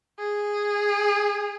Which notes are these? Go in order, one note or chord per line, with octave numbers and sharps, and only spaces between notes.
G#4